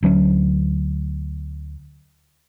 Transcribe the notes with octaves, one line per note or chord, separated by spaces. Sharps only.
D2 F#3 A3 C#4